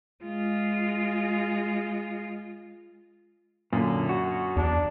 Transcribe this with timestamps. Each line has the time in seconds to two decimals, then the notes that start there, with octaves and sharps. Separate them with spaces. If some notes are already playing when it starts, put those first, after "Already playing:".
0.24 G#3 F4
3.73 F#2 A#2 D3
4.09 F#4
4.57 E2 D4